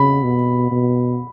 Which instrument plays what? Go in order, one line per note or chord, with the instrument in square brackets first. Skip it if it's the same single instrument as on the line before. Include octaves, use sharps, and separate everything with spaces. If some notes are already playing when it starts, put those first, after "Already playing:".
Already playing: [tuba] C#3 [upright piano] B5
[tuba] B2
B2